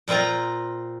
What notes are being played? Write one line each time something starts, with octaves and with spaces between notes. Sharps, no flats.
A#2 A#3 C4 F4 A#5